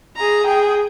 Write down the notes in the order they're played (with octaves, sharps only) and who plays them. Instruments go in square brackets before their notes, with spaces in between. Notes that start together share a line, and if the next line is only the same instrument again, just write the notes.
[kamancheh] G#4 A#5
G#4 G5